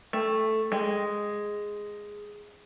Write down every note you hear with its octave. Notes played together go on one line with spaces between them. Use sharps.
A3
G#3